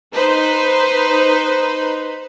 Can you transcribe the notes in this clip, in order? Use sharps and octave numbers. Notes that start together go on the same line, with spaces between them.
D#4 B4 C5